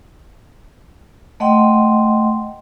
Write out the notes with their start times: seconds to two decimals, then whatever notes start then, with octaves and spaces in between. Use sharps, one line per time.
1.40 A3 D#5 F#5 G5 C6